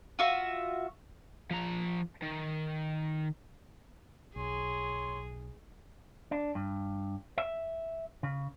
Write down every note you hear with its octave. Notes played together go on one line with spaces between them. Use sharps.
F4 F#4 E5
F3 A#5
D#3
B1 G#4 C#5 C6
D4
G2
E5
C#3